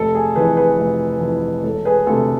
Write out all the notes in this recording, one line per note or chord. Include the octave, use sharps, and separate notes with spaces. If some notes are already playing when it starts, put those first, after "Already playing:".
Already playing: F1 A4
G#4
F2 E3 G#4 B4
G#4 B4
F1
F2 E3
E1 A4
G#4 B4
D2 C3 A4